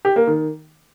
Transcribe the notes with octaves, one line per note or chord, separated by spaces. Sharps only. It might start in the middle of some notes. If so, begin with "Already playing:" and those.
G4
A#3
D#3